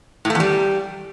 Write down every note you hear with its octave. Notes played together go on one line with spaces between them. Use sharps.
A2
A3
E2
G3